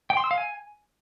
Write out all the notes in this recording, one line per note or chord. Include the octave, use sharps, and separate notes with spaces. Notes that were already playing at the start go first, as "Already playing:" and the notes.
G5
C6
E6
F5
G#5